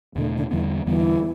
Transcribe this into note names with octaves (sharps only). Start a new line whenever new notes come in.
E2 B2 D3 A3
D3
E2 D3 E3 G3 B3
E2 D3 E3 G3 B3